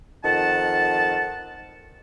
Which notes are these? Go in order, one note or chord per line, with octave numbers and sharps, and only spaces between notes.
F2 D#3 F#5 A5